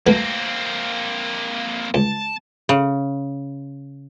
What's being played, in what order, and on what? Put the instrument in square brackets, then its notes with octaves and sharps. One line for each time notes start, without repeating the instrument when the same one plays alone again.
[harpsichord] A3 F#4 B4 [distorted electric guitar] A#3 C4
[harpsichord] C#2 [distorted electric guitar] A5
[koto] C#3